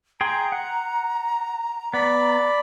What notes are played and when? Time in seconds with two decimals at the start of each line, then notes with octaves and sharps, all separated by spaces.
0.21 G#4 G5 A#5 C6
0.52 F#5
1.93 B3 D5 B5